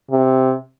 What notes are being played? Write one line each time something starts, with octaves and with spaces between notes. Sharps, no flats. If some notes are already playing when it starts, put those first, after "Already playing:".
C3